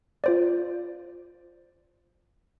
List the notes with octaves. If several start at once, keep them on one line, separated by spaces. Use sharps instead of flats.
F4 C5 D5